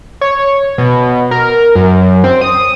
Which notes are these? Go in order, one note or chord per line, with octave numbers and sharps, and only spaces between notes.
C#5
B2
A#4
F#2
C4
D#6